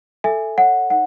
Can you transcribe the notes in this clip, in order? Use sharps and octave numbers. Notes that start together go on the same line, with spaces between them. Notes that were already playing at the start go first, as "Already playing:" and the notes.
A4 E5 G#5
C#5 F#5
D#4 F#5